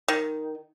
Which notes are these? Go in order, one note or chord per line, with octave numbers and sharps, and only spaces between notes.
D#3